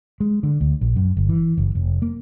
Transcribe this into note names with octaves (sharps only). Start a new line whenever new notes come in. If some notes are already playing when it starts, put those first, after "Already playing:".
G#3
D3
D2
A#1
F#2
G1
E3
F#1
F1
A#3